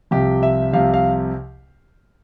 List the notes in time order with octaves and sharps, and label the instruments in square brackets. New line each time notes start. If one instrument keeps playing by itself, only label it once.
[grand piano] C2 C3 F3 G4
E5
C2 C3 F3 F5
F5